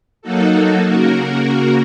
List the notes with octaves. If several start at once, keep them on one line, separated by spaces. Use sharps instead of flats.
F#3 A#3 D#4 F#4 A4
C#3 A#3 F#4 A#4